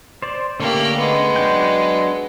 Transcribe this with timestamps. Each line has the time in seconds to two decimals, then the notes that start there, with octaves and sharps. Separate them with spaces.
0.22 C5 D5
0.60 D3 A3 A#3 C#4 G4
0.97 G#3 B3
1.36 F#3 D4 G5